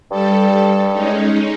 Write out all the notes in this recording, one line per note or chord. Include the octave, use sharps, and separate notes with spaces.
G2 G3 A4
G#3 C#4 D#4